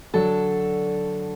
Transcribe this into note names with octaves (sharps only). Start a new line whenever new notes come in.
D3 F#3 D4 A4